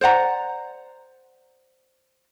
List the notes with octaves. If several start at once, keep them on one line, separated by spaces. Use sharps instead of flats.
C5 D5 F#5 A#5